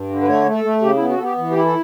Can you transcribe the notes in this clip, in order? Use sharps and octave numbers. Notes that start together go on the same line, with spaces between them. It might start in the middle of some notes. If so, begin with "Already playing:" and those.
Already playing: G2
D3
B4
A3 C#5
A3
A4
A3
C#3 G4
B3 E4
F#4
B3 A4
G4
E3
G4
E4
A4